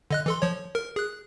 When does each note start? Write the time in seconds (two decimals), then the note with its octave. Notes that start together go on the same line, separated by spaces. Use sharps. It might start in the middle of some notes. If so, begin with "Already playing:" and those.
0.11 D3 D#5 F#6
0.26 E3 A4 C6
0.42 F3 C#5
0.75 A#4
0.96 G#4 F#6